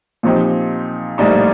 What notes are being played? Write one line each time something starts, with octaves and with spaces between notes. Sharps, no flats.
A#2 F3 C4 D#4 G4
A#1 A2 G3 A#3 D#4